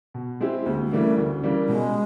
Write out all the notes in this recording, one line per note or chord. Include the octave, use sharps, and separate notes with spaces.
B2
G#3 C4 E4 G4
D2 A#3
G#3
C#3 E3 G3 A3 A#3
D2
C#3 E3 G3 A#3
B2 G#3